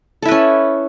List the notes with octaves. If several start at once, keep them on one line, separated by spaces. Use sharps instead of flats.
C#4 E4 A4 B4